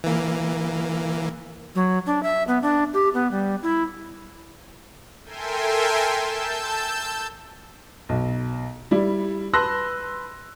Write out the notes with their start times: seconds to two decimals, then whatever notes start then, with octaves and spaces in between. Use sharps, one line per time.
0.04 E3 A#3
1.75 F#3
2.07 D4
2.23 E5
2.48 B3
2.62 D4
2.94 G4
3.14 B3
3.31 G3
3.63 E4
5.25 A4 A#4 E5 G5 G#5 C6
6.11 A5 E6 G6
8.09 B1
8.91 G3 E4 D5
9.53 B4 A5 C6 E6 F#6 A#6